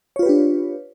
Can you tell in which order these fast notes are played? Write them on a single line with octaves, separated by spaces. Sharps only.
C#5 F4 B4 G4 D4